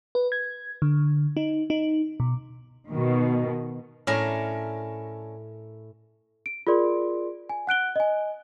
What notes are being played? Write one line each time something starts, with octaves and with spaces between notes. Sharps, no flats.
B4
G#6
D3
D#4
D#4
B2
B2 D#3
A2 C#4 D4 A#4
D7
F4 G#4 A#4 D5 C6
G#5
F#5 F#6 D7 G7
D#5 G#5